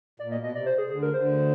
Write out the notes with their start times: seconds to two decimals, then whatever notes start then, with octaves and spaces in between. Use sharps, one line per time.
0.19 A#2 D5
0.32 D#5
0.35 B2
0.43 D#5
0.52 C3 D5
0.66 C5
0.78 G#4
0.90 D2 D3 G#4
1.02 A#4
1.13 D2 D3 C5